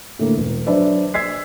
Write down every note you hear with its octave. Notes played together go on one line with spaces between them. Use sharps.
A2 D3 A#3
E1
F#3 D4 B4 C5 D5 E5
E6 G#6 B6 C7